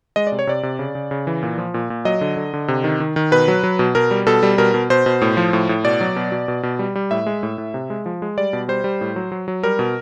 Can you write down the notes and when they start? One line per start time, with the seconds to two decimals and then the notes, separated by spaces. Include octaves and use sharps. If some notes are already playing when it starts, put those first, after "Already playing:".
0.16 G#3 D#5
0.27 D5
0.32 C3
0.39 C#5
0.47 C3 D5
0.63 C3
0.79 C#3
0.95 C#3
1.11 C#3
1.27 E3
1.43 A#2
1.58 F3
1.74 A#2
1.90 A#2
2.05 F#3 D#5
2.21 D3
2.37 D3
2.53 D3
2.68 C3
2.84 D#3
3.00 D#3
3.16 D#3
3.32 B2 B4
3.48 F#3
3.63 F#3
3.79 B2
3.95 B2 A#4
4.11 G3
4.26 B2 A4
4.43 G3
4.58 B2 A#4
4.74 B2
4.90 B2 C5
5.06 B2
5.21 A2
5.37 F3
5.53 A2
5.69 A2
5.84 B2 D5
6.01 F#3
6.16 B2
6.32 B2
6.48 B2
6.63 B2
6.79 G3
6.95 G3
7.11 A2 E5
7.26 G#3
7.43 A2
7.58 A2
7.74 C3
7.90 G#3
8.06 F3
8.22 G#3
8.38 G3 D5
8.53 B2
8.69 G3 C5
8.84 G3
9.01 A2
9.16 F#3
9.32 F#3
9.48 F#3
9.63 G3 A#4
9.79 B2